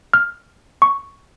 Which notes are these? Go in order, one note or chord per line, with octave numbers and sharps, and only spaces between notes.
F6
C#6